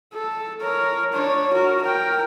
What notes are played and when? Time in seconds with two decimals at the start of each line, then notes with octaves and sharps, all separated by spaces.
0.13 A4
0.61 A#4 C#5
1.13 D4 C#5
1.53 F#4 A#4
1.82 A#4 G5